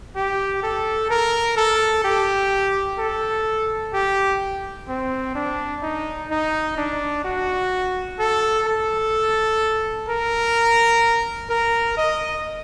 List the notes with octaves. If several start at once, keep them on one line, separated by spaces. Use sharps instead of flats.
G4
A4
A#4
A4
G4
A4
G4
C4
D4
D#4
D#4
D4
F#4
A4
A4
A#4
A#4
D#5